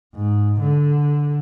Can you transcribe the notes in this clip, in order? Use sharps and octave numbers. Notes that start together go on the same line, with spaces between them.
G#2
D3